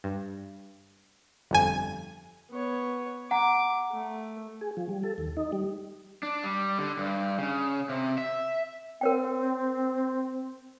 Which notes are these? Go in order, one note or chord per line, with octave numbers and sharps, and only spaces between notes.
G2
G1 F2 G#5
B3 C#5
F#5 A#5 D6
A3
G#4
F3
G3
A4
D#2
D#4
G3
D4
G3
D3
G2
C#3
C3
E5
C4 A#4 C#5 G5